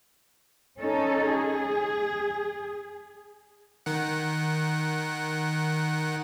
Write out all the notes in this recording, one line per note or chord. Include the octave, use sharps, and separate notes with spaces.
C#4 D#4 A4
G#4
D#3 F#5